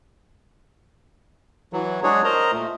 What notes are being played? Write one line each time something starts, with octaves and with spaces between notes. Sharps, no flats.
E3 F#3
F#3 G#3 D4 F#4 G#4 C#5
A#4 C5 D#5 A#5
A#2 A3